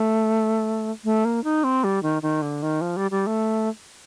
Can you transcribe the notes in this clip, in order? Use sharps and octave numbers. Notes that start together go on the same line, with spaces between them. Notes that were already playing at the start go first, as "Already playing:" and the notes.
Already playing: A3
A3
A#3
D#4
C4
G3
D#3
D#3
D3
D#3
F3
G3
G3
A3